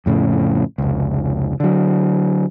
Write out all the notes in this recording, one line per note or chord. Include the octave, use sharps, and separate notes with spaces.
F2 A2 C#3
F1 C#2
D3 F#3